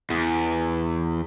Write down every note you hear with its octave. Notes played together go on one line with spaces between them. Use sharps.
E2